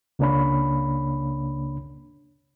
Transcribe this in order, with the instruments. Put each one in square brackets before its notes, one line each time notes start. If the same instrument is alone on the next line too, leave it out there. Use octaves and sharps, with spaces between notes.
[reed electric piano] C#2 C#3 A#3 D4 C#5 B5